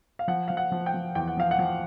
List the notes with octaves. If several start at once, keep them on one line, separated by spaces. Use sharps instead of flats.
F5
F3 F#5
F3 F5
F#5
F3
G5
F3
E2 G5
F#5
F3 F5
F#5
F3